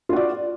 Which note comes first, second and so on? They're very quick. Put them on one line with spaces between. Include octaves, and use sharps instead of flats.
F4 F#4 D5